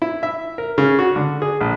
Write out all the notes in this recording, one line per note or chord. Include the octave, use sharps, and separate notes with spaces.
E4
E5
A#4
C#3
F#4
D3
G#4
A#1